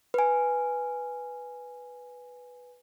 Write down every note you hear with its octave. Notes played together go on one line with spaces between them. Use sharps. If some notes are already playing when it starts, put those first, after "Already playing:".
B4 G#5